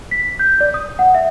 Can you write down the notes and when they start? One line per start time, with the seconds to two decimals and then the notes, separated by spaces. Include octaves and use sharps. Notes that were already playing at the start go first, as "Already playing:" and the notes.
0.11 B6
0.39 G6
0.61 D5
0.74 D#6
0.99 F#5
1.15 E5